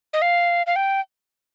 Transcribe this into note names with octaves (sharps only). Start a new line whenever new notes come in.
D#5
F5
F5
G5